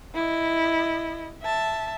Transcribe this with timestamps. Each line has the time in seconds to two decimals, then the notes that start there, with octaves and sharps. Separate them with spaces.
0.15 E4 D#5
1.43 E5 A5